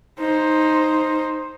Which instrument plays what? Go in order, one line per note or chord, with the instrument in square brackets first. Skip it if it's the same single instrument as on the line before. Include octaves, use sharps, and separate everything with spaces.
[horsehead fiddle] D#4 C5